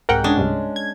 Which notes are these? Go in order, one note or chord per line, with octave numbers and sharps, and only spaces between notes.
C2 G#2 A#4 F#5 G5
G#3 C#4 D4
C2 G2
G#6